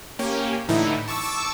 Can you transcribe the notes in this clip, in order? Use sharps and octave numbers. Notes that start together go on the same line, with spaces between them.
A#3 C#4 G4
A2 D3 E3 D#4 E4
A5 C#6 D6 E6